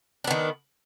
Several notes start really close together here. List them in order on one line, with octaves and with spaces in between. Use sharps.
D4 B3 D#3